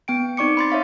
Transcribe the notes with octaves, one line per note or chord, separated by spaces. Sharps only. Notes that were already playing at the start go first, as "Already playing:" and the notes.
B3 G5 D7
C4 D#4 D5 C#6 D6 C#7
B5 C6 A6
C#5 E5 F5 C#6